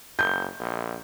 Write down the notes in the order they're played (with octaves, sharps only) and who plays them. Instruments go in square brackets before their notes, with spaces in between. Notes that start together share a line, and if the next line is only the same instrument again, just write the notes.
[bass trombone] F#1 [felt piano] G6
[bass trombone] A#1